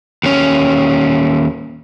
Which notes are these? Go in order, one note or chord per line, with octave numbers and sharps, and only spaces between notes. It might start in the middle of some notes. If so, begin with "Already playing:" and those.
D#2 C#4